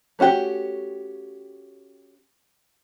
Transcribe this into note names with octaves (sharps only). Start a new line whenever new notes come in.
A3 C#4 F#4 G4 G5